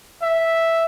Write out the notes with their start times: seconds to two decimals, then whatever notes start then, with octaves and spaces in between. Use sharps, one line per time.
0.23 E5